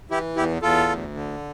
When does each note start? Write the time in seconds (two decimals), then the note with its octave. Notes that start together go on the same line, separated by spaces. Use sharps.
0.10 E3 E4 G4
0.36 E2 E4 G4
0.62 E2 F4 A4
0.89 D2
1.14 D3